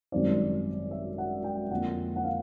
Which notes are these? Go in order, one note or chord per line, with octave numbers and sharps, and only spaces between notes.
G#1 F#2 D#3 G3 C4 D5
E5
F#5
G5
F2 D3 F3 A#3 F#5
F#5
F5